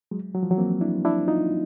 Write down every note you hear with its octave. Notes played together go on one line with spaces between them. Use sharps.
F#3 G#3
F#3
F3
E3 F#3
A#3 C4
D4 E4
D4 E4
D#4 F4